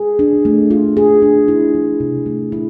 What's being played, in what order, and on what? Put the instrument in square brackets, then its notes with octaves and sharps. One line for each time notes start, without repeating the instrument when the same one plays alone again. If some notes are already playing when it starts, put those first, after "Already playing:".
Already playing: [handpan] G#4
D4
A3
F4
G#4
D4
E4
F3
C3
A3
E4